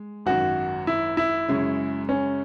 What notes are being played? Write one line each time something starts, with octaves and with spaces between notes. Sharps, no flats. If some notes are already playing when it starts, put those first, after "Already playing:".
Already playing: G#3
G#1 F#2 D#3 F#4
E4
E4
F#2 C#3 G#3 C#4 G#4
C#4